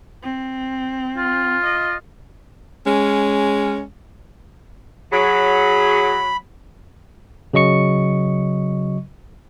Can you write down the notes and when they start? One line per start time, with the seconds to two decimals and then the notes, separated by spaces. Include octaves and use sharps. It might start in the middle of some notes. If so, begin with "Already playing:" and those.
0.23 C4
1.17 F4
1.64 D#5
2.85 G#3 C#4
5.12 F#3 G#4 B5
7.53 C#3 F#3 D#5 C#6 C#7